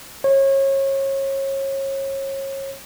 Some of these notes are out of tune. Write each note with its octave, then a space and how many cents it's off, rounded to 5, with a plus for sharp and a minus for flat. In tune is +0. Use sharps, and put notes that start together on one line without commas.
C#5 -30